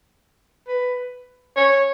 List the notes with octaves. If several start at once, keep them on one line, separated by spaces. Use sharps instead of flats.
B4
C#5